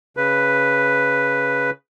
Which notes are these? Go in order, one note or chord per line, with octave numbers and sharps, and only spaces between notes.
C#3 B4